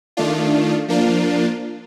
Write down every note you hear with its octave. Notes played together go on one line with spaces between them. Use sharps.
D#3 A3 D4 F4
F3 A#3 D4 F4